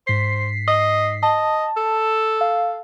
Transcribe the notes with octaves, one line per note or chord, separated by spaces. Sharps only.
G#2 C5 B6 C7
D#5
D#5 A5
A4
F5